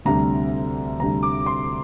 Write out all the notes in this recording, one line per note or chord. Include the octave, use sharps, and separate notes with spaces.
D2 C3 G3 D4 A#5
D2 C3 G3 D4 A#5
D6
C6